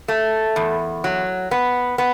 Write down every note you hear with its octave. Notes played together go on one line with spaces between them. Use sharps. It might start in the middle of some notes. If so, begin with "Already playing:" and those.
A3
E2
F#3
B3
B3